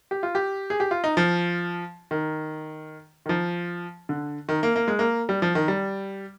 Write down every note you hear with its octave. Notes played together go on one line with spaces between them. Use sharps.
G4
F4
G4
G#4
G4
F4
D#4
F3
D#3
D#3
F3
D3
D#3
A#3
A#3
G#3
A#3
G3
F3
D#3
G3